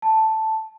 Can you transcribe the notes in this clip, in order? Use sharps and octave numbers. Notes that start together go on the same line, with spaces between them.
A5